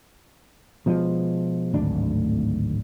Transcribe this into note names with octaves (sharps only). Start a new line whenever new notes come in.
B2 F3 G#3
D1 G#1 D2 D4